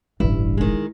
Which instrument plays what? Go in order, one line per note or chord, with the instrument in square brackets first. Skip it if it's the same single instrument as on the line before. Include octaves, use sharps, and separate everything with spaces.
[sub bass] E1 [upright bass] A1 C#3 [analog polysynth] G2 [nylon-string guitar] E4
[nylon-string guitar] D#3 G#3